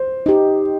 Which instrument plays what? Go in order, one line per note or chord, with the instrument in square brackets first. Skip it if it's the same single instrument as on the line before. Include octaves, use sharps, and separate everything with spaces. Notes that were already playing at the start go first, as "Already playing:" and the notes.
Already playing: [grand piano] C5
[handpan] D#4 G4